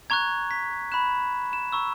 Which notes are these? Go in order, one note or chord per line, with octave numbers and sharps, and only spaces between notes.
A#5 C#6 F#6 G#6
B6
B5 F#6 E7
E7
A#5 C#6 E6